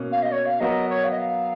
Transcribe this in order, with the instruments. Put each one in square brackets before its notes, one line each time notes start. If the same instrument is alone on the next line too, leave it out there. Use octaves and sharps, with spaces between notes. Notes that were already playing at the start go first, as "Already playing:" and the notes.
Already playing: [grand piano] B2 A#3 C#4
[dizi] F5
D#5
C#5
F5
[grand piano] F#3 B3 F#4 A#4 [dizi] D#5
[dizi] C#5
F5
D#5
F5